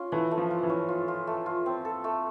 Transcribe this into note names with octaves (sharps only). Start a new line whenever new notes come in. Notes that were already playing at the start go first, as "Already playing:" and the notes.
Already playing: C#4 F4
E3 A3
A3
F3
F4
E3
C#4
F4
F4
A3
F4
C4
A4
A3